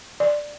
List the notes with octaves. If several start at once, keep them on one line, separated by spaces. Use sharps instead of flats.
D5